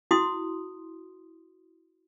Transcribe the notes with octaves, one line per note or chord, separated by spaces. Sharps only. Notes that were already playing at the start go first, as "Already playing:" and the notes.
E4 F#4 C6 D#6